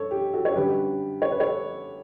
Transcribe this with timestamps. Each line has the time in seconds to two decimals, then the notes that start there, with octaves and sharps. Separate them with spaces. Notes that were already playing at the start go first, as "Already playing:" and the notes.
Already playing: G2 A4 C#5
0.11 G4
0.33 F#4 A4
0.45 C#5
0.55 F#2 D3 G3 G4 B4
1.22 C#5
1.31 B4
1.40 A4 C#5